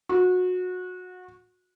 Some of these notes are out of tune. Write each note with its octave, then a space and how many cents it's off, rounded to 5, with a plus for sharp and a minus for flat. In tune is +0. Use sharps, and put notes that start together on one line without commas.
F#4 -25